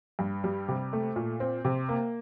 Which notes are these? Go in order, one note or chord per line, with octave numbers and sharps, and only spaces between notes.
G2
G3
C3
A3
A#2
C4
C3
A#3